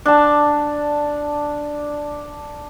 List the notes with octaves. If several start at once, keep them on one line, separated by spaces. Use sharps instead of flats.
D4 A5